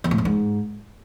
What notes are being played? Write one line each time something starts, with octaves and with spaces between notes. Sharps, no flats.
E2
A2
F2
G#2